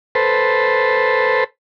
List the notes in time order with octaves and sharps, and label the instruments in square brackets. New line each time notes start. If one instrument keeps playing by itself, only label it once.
[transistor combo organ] A4 B4 C5